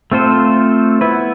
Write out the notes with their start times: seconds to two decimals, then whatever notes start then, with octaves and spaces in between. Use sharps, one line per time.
0.12 A3 C4 F4 A4 C5
1.01 B3 E4 B4